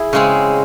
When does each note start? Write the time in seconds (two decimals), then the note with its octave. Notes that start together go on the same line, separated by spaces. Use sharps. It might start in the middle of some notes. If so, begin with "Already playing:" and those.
Already playing: E4 G#4
0.13 C#3 G#3 C4